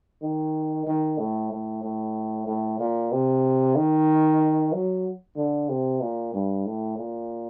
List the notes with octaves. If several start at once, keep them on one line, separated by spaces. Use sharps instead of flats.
D#3
D#3
A2
A2
A2
A2
A#2
C3
D#3
F#3
D3
C3
A#2
G2
A2
A#2